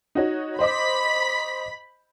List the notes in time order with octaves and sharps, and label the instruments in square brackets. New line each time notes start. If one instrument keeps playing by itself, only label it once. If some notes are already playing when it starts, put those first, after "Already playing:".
[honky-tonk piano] D#4 F#4 C#5
[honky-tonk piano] C5 D#5 D6 [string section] B5 B6